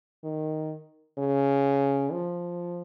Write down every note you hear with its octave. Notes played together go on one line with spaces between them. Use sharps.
D#3
C#3
F3